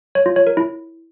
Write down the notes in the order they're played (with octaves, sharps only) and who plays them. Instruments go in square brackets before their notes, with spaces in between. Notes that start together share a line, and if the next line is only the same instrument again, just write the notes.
[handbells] C#5
F4
C#5
A#4
E4